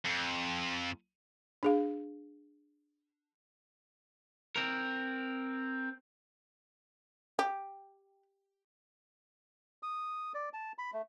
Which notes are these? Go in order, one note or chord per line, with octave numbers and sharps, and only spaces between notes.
F2
D4 G#4 F5
C4 A#4
G4
D#6
D5
A5
B5
A3